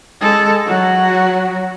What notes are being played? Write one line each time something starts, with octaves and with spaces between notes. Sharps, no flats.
G#3 A4
F#3 F#4